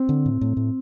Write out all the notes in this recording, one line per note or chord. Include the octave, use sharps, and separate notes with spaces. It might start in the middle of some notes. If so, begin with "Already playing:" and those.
Already playing: C4
D3
A2
A2
A2